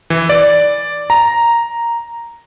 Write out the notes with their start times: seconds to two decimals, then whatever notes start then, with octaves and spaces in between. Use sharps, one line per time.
0.10 E3
0.29 D5
1.10 A#5